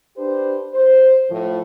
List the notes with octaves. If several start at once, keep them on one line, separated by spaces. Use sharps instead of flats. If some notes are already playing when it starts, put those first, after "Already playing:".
D4 G4 B4 C5
C5
A2 F3